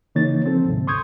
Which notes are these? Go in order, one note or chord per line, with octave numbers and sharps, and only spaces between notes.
C#3 E3 A#3 D#4 C#5 A6
F3 C4 A4
D2 G#2 C3
C6 C#6 D#6 G6 G#6